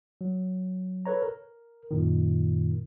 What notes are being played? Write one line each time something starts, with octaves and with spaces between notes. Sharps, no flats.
F#3
A4 B4 C#5 A#5
A#4
F#2 A#2 D#3